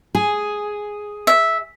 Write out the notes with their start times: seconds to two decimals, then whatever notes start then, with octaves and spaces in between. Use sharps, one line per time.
0.15 G#4
1.27 E5